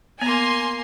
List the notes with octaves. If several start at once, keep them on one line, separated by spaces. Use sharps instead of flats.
A#3 B3 G#5 A#5 C6